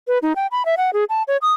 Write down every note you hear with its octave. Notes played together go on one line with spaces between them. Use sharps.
B4
D#4
G5
B5
E5
F#5
G#4
A5
C#5
D#6